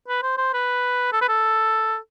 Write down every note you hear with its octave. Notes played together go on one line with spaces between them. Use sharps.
B4
C5
C5
B4
A4
B4
A4